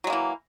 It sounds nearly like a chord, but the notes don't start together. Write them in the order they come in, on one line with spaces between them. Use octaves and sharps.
F#3 G#3 A#3 E3